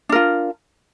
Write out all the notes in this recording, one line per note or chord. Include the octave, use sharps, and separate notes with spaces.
D4 F4 A#4